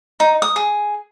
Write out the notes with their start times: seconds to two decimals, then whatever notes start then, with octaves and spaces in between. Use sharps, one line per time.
0.20 D#4
0.42 D#6
0.56 G#4